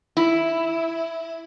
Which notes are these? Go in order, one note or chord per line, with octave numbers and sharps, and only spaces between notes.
E4